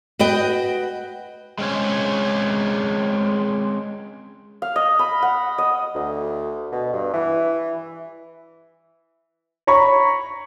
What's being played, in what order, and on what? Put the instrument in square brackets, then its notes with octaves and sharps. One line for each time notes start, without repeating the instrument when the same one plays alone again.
[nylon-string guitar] F#4 B4 D#5 G5
[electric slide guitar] G#3 C4 C#4 G#4
[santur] F5
D#5
B5
F#5
D#5
[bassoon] D2
B2
G2
E3
[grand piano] C#5 A#5 B5 C#6